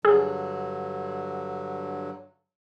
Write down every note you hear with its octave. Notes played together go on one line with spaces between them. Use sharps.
G2 D3 F#3 G#4